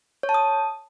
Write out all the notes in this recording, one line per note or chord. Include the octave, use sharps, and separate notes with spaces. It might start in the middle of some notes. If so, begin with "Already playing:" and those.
C#5
A5
D#6